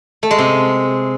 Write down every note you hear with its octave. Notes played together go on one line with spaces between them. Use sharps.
A3
G#3
C3